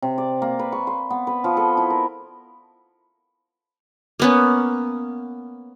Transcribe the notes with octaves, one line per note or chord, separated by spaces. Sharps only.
C3
D5
A#3
B4
C#6
C6
B3
B4
F3
A4
E4
A#4
A#3 B3 C#4